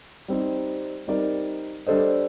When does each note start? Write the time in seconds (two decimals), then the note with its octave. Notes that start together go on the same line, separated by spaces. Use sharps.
0.28 G3 C4 D#4 G4
1.07 G3 C4 D#4 A#4 D5
1.87 G3 D4 A4 C5 D#5